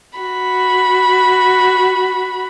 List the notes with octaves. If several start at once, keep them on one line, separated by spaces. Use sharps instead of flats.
F#4 B5